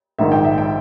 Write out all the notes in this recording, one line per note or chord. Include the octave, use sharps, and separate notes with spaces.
A#1 G#2 D#3 E5
G5
E5
G5